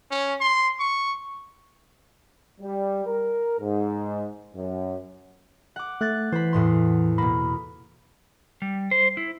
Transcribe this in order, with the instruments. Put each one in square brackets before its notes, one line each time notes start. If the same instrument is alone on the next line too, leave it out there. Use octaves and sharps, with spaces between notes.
[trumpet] C#4
C6
C#6
[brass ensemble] G3
A#4
G#2
F#2
[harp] F#5 D6
[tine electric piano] A3 [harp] F#6 G#6 A6
[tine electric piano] E3 [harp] C5 B5
[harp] E2 A2 C6
[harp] B2 A#3 [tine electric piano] B5
[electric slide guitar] G3
C5
E4